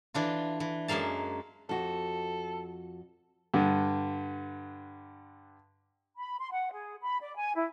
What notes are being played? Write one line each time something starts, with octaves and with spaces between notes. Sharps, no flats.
E3 D4 F4
E3
F#2 G#3 A#3 F5 A5
F2 F#4 A4
G2 D3
B5
C6
F#5
G#4
B5
D5
G#5
E4